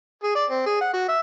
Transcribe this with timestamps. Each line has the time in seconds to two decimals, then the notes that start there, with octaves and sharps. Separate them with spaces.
0.24 G#4
0.35 D5
0.50 C4
0.66 G#4
0.81 F#5
0.94 F#4
1.08 E5